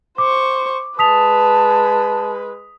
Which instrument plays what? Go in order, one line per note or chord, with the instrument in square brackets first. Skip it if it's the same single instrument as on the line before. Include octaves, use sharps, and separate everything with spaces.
[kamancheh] C5 C#6 [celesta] D6
[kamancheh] G#3 B4 [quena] A5 [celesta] D#6 B6 F7